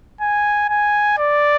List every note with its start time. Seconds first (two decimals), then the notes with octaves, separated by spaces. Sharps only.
0.21 G#5
0.69 G#5
1.18 D5